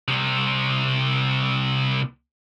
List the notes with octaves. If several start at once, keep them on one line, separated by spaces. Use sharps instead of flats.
C2 C3